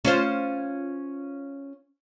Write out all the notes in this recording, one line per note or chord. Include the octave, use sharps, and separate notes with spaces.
C#4 F4 C5